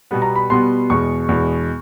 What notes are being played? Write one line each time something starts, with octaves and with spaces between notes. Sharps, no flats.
B2 G3 B3
A#5
B5
B2 G3 B3 C6
E2 B2 G#3 C#6
E2 B2 G#3